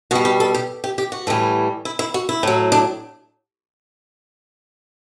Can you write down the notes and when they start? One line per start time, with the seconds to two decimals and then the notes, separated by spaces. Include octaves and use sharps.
0.11 B2 G3 F#4
0.25 G4
0.40 A4
0.54 G4
0.84 G4
0.98 G4
1.12 F#4
1.27 A2 E3 G3
1.85 E4
1.99 E4
2.14 F#4
2.29 E4
2.43 A2 F#3
2.72 D4